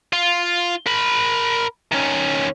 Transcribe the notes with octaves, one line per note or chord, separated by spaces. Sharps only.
F4
A#4 B5
D#3 C#4